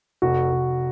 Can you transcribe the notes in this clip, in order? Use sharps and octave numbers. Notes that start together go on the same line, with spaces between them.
F1 F#4
F1